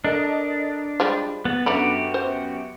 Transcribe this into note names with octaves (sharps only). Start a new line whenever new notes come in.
D4 A4 A#4 D#5
F3 G3 G#3 B5
B3 A6
F#2 D3 B3 F#4 G4 A#5 B5 D6
C5